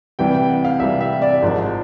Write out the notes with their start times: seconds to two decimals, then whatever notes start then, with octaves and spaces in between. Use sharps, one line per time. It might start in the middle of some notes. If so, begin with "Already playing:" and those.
0.19 C2 C3 E3 G3 G5
0.34 G5
0.49 F#5
0.65 F5
0.80 C2 C3 E3 G3 E5
1.00 E5
1.22 D5
1.42 G#1 G#2 F3 D5